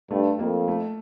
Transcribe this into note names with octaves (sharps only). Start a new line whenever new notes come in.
G2 A3
F2 A#3
A3